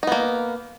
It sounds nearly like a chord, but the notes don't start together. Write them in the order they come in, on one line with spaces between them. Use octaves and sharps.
D#4 B3 A#3